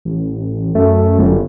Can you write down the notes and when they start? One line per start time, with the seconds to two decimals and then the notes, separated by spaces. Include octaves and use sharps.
0.05 A1
0.75 F#2 A3
1.19 G1